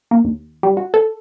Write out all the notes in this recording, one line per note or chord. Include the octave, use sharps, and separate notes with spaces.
A#3
D#2
G3
F#4
A4